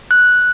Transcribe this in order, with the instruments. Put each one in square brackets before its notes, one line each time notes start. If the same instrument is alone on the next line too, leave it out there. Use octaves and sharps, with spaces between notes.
[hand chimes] F#6